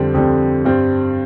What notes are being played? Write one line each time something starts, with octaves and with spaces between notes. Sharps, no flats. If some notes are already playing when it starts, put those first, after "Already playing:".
Already playing: F2 D3 G3 C4
F2 D3 G3 C4
G2 G3 C4